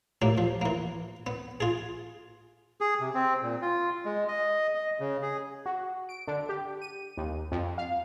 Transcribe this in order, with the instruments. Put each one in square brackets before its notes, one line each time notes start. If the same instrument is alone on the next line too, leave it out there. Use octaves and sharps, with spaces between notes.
[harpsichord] A2 A#3 G4
F3
E3 A#3
B3
F4 G#4
[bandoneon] G#4
C3
C4
A#2
F4
G#3
D#5
D#5
C#3
G#4
[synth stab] F#4
D7
D3
G4
D#7
D#2
F2
F5